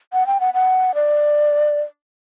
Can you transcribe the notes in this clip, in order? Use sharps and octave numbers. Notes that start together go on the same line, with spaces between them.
F#5
G5
F#5
F#5
D5